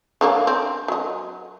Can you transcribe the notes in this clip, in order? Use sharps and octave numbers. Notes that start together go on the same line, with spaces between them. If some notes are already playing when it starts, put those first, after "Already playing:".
D3 F#3 A#3
C4
F#3 D#5